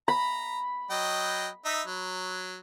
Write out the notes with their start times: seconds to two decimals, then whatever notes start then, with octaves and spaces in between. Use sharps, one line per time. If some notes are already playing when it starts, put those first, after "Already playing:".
0.08 A#5 B5
0.91 F#3 D#5 G5
1.65 D#4 E5
1.87 F#3